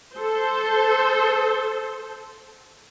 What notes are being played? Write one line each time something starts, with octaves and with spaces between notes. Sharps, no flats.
A4 C5